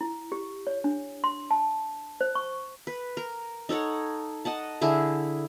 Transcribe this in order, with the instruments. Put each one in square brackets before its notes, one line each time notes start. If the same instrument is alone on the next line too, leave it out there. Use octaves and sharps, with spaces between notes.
[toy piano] E4
G4
C#5
D4
C6
A5
C5
C#6
[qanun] B4
A#4
D#4 A4 C#5 F#5
D#5 F#5 A5
D3 E4 G#4